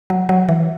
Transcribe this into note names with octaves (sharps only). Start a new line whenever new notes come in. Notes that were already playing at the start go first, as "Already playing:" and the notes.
F#3
F#3
E3